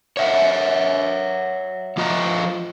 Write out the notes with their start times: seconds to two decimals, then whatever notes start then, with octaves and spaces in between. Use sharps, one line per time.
0.17 C#5 E5 F#5
1.97 F3 F4 D#5 A#5